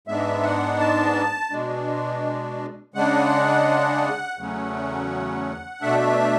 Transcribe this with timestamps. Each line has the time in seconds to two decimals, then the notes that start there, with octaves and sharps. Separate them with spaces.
0.08 G#2 G#3 B3 D4 E5
0.44 F#5
0.79 A5
1.51 B2 G#3 D4
2.94 C#3 G#3 D4 F#5
4.38 E2 C#3 F#3 A3 C#4
5.81 B2 A3 D4 E5